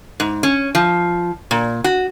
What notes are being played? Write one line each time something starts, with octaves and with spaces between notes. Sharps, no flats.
G#2
C#4
F3
A#2
F#4